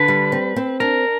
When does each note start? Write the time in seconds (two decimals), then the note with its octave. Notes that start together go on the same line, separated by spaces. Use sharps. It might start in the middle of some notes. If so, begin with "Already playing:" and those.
Already playing: D3 B4
0.08 G3
0.32 C4
0.56 C4
0.80 D4 A#4